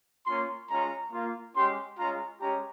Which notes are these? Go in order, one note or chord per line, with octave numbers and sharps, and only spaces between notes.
A#3 C#4 F4 C6
G#3 C#4 F4 A#5
A#3 F4
G#3 C#4 G4 C6
G#3 C#4 F4 A#5
G#3 C#4 G4 A#5